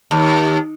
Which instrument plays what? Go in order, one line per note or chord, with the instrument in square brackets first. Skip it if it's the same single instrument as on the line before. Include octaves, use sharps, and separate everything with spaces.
[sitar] D#2